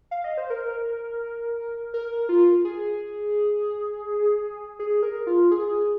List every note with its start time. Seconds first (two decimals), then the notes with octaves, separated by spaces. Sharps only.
0.11 F5
0.24 D#5
0.37 C5
0.50 A#4
1.94 A#4
2.29 F4
2.65 G#4
4.79 G#4
5.03 A#4
5.27 F4
5.51 G#4